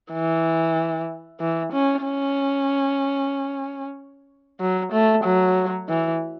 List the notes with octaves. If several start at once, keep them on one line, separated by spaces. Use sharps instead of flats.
E3
E3
C#4
C#4
F#3
A3
F#3
E3